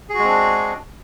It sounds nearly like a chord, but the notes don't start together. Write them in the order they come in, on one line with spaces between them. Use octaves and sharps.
G#4 F#4 G#3 C4 D4